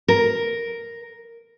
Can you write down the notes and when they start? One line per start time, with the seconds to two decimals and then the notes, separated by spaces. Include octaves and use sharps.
0.08 A#4